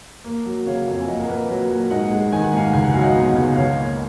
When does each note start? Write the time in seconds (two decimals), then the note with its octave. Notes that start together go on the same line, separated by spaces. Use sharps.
0.24 A#3
0.46 F#3
0.66 C#3 C#5 F5
0.88 F2
1.01 G#5
1.08 A#2 D#5 F#5
1.20 A#4
1.28 A#3 B4
1.49 F#3 A#4 C#5
1.70 A#2
1.90 G#2 D#5 F#5
2.11 G#3
2.32 D#3 G#5
2.44 F#5
2.53 G#2 F5 G#5
2.73 C#2 G#5
2.84 F#5
2.94 F#3 F5
3.04 D#5 F#5
3.15 B2
3.36 C#2
3.56 C#2 C#5 F5
3.76 A#3